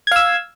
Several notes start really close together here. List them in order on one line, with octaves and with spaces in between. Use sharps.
G#6 F5 E6